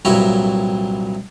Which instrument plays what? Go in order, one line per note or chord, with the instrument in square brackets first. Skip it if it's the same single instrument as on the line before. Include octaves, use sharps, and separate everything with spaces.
[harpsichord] C2 G2 A#2 F#3 E4 C#5